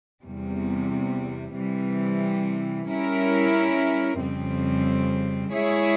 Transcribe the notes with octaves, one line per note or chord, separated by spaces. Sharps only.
E2 C3 G3
C3 E3 G3
G3 C#4 E4 A#4
F2 C#3 G3 C4
G#3 E4 G#4 C#5 E5